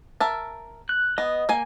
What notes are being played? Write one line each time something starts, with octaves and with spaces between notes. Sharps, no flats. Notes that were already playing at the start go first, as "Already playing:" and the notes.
A#4 E5 A5
F#6
B3 D#5
A#3 G#5